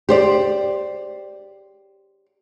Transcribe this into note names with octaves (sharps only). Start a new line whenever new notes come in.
G4 C5 D5